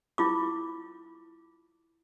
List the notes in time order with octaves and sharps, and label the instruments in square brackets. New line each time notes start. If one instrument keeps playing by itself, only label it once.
[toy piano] E4 F4 D6